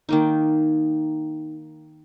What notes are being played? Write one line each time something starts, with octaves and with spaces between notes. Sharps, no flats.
D#3 A#3 D#4